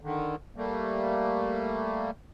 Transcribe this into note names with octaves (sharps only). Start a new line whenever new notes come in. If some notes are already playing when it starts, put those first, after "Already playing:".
D3 D#3
G3 A3 A#3